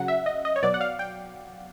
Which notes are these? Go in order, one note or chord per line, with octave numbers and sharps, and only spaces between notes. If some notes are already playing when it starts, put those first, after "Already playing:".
Already playing: C#3 F#3 F#5
E5
D#5
D#5
C#5
B2 F#3 D5
F#5
F5
G5